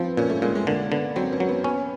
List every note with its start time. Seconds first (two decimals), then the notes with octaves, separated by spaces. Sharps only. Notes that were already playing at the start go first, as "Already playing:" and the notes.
Already playing: F3 B3 C4
0.17 A#2 C#4
0.30 A3
0.42 A#2 G#3
0.55 G#3
0.67 D3 A#3
0.91 D3 B3
1.16 F#3 C4
1.32 C#4
1.40 F#3
1.49 B3
1.64 B3 C#4